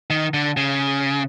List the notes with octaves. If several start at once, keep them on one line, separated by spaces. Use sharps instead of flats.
D#3
D3
C#3